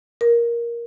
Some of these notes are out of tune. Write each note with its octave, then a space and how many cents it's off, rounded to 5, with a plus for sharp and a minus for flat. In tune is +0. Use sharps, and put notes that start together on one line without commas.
A#4 +10